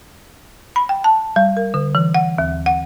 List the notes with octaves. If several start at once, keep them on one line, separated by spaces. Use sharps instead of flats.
B5
G5
A5
G3
A#4
D3
E3
F#5
D#2
F#5